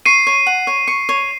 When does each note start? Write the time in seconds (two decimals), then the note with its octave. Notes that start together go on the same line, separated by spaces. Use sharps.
0.06 C#6 C7 D#7
0.27 C#5
0.47 F#5
0.67 C#5
0.88 C#6
1.09 C#5